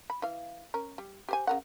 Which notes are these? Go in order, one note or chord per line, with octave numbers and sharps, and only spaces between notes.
B5
E3 F5
C#4 A#4
G3
G4 C5 G#5
C#3 A#4 F#5